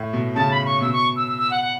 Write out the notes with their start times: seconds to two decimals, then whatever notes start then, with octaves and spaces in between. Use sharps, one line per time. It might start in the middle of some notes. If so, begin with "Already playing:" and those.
Already playing: A2
0.13 B2
0.35 C#3 A5
0.51 B5
0.61 B5
0.66 C#6
0.81 B2 E6
0.93 C#6
1.16 E6
1.28 E6
1.38 E6
1.51 F#5
1.61 F#5